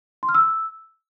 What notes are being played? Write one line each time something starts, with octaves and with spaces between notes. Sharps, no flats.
C6
F6
E6